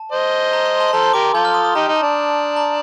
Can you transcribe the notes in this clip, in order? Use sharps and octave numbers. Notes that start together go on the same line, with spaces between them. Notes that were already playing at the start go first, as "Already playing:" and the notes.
Already playing: A5
C5 D#5
A#5
C6
A5
C6
A4 C5 A#5
C6
G4 A#4 D6
F4 A4 G6
F6
D#6
D#6
D#4 G4 A#5
D#4
A5
D4
A#5